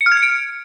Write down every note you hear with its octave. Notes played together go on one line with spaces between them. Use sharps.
C#7
F6
G#6
C#7
D7